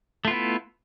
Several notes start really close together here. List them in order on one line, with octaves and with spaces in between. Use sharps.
A3 F4 B3 E4